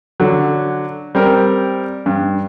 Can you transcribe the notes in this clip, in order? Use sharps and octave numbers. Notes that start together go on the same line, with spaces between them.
D3 F#3
G3 C4 A#4
G2